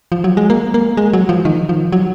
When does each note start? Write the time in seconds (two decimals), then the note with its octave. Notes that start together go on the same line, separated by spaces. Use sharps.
0.12 F3
0.24 F#3
0.37 G#3
0.50 A#3
0.74 A#3
0.97 G#3
1.13 F#3
1.29 F3
1.45 D#3
1.69 F3
1.92 F#3